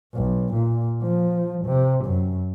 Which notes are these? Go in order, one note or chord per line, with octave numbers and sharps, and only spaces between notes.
B1
A#2
F3
C3
F#2